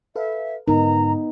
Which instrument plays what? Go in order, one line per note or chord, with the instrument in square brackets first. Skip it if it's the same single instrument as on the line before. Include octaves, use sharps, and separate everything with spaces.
[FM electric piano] A4 B4 F5 [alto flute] E5
[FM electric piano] G#2 D3 A#4 [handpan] B3 D#4 [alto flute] A#5